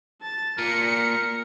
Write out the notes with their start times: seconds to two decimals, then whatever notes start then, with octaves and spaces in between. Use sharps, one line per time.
0.21 A5 A6
0.58 A#2 A#4 C#7